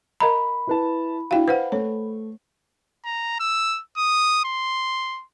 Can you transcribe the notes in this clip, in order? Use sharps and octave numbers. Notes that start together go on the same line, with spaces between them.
A#4 D#5 A#5 B5
E4 B4 A5
D4 E4 F#4 F5 G5
B4 C5 F5 F#5
A3 C#5
A#5
E6
D#6
C6